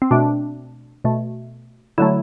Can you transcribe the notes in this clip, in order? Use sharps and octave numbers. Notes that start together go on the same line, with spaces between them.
C4
B2 A3 D4
B2 A3
D3 F#3 A3 E4